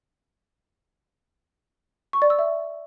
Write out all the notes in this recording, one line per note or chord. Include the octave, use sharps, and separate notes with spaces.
C#6
D5
E6
E5